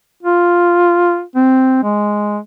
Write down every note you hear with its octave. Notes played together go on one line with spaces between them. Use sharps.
F4
C4
G#3